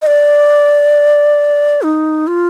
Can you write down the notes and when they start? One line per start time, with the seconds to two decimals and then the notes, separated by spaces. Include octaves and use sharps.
0.02 D#5
0.07 D5
1.82 D#4
2.27 F4